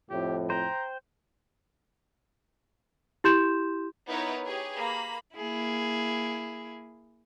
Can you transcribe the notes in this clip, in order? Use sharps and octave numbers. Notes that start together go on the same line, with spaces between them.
F2 A2 G4
C5 G5 A#5
E4 G4 C6 G6 E7
B3 D#4 E4 A#4 B4 C#5
G4 G#4 B4 C#5
A#3 B5
A#3 E4 G#4